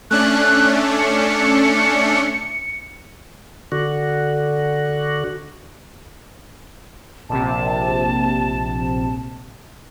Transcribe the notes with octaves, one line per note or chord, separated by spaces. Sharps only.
A3 C#4 D4 F#6
C#7
D3 F#4
A#1 C3 A5